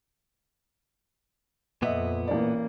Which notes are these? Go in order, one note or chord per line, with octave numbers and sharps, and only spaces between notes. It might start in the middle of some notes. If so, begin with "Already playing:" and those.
F2 A#2 B3 D#5 E5
A1 A#3 D5